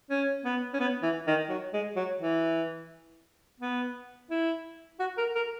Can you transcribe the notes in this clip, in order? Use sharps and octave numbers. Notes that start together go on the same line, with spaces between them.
C#4
B3
C#4
B3
E3
D#3
F#3
G#3
F#3
E3
B3
E4
F#4
A#4
A#4